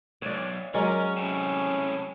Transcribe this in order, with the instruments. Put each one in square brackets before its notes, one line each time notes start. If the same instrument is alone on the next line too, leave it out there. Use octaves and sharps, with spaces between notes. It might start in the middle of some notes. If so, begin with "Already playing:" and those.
[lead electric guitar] B1 [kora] C#5 D5
[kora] F#3 G#3 D5 [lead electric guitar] C#4 [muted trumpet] A#4
[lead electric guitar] A2 C3 [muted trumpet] C#4